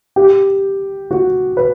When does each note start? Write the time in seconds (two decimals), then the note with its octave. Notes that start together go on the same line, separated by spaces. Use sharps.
0.16 G4
1.11 F#4
1.57 B4